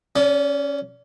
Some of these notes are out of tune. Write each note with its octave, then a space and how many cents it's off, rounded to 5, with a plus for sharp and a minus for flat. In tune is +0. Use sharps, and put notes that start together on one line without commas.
C#4 +0 D5 -35